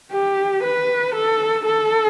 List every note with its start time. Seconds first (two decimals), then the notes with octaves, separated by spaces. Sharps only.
0.12 G4
0.64 B4
1.15 A4
1.66 A4